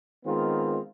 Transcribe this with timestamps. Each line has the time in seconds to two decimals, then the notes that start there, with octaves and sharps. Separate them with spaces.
0.24 D#3 G#3 B3 C4 F4